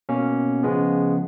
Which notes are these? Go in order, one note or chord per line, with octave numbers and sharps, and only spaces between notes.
B2 A#3 C#4
C#3 F3 G#3 B3